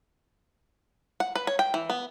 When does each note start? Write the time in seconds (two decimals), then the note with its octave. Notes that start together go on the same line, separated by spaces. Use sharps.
1.20 F#5
1.35 B4
1.47 C#5
1.59 G5
1.74 E3
1.90 B3